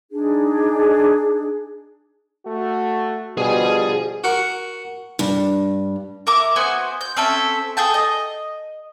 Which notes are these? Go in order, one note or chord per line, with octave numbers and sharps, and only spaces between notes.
D4 D#4 G#4
A3 F#4
B2 D3 F3 G3 G#4 G#5
F#4 A#4 F#5 C#6
G2
A#4 E5 D6
B3 F#4 C5 G#5
G6
C4 C#4 A4 E5
G#4 A4 G5 A5
D#5